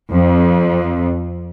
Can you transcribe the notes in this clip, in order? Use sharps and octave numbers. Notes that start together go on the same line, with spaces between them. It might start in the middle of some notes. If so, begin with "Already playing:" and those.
F2